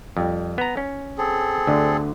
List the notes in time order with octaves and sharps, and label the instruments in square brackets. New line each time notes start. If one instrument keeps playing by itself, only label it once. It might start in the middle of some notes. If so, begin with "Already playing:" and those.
[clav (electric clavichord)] F2 G3
B3 A#5
C#4
[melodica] C4 G#4 A4
[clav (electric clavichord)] D2 D3